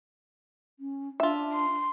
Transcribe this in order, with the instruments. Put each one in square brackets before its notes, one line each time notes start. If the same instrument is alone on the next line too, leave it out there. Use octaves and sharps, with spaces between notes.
[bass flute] C#4
[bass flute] D4 [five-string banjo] F4 E5
[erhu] C6